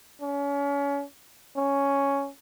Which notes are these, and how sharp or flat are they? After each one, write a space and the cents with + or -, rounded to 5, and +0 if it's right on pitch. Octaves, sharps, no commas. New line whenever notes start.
C#4 +30
C#4 +5